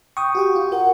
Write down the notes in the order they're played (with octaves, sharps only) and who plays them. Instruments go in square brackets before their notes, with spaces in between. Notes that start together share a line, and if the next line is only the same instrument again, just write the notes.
[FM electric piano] G5 [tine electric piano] C#6 D#6
[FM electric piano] F#4 G4 G5
F4
[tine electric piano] A#4 [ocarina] F#5